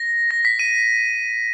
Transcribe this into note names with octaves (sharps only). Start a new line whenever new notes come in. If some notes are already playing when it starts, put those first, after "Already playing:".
Already playing: A#6
A#6
B6
D#7